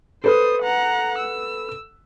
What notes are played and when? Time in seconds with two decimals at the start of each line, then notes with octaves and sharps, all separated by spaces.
0.24 A4 B4 C5 D#6
0.63 F#5 A#5
1.18 E6